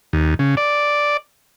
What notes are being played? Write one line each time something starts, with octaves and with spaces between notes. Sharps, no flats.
D#2
C#3
D5